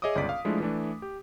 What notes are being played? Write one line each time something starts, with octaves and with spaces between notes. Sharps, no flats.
G#4 C#5 D#5 E5 D6 D#6
G1 C#2 D5 B6
F5
F3 G#3 A3 D4 E4 F4
E3 A3 D4
G4